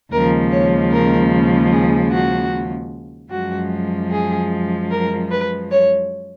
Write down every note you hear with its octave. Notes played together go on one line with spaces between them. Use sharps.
D#2 C#3 F3 G#3 A#4
C#5
A#4
G#4
F#4
F#2 F3 G#3 F#4
G#4
A#4
B4
C#5